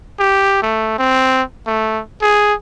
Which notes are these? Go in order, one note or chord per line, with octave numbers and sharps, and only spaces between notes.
G4
A3
C4
A3
G#4